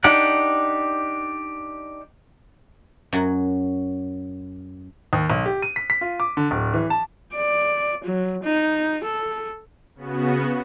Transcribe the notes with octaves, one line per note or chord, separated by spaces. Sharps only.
D4 D#4 G4 F#5
F#2 F#3 F#5
D#2
B1
G4
D#7
B6
B6
F4
D6
D3
D1
E3
A5
D5
F#3
D#4
A4
C#3 B3 F#4